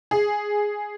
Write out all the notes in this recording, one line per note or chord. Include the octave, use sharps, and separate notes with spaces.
G#4